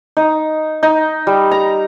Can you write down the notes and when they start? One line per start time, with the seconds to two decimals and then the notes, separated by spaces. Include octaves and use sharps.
0.17 D#4
0.83 D#4
1.27 G3
1.51 A#5